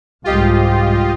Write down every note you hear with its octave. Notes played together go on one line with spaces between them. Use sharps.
C2 G#2 F4 G4 D#5